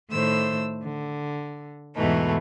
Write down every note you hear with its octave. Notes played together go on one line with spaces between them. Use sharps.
A2 D#3 A3 C5 E6
D3
E2 G#2 B2 E3 A3 D#4